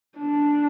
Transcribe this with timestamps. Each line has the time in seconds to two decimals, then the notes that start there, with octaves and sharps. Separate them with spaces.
0.18 D4